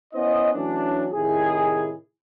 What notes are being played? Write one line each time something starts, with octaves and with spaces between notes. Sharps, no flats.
B3 C#4 E4 C5 D#5
E3 F#3 A3 C#4 D4
A2 C3 D#3 E4 G#4